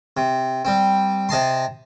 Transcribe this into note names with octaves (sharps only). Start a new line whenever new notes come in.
C3
G3 C4
C3 D#5 A5 C6